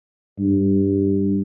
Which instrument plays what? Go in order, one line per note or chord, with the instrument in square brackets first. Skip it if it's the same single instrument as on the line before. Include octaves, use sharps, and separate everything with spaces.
[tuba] G2